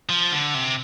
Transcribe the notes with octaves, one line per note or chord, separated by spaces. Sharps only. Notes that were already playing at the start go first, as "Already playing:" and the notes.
F3
D3
C3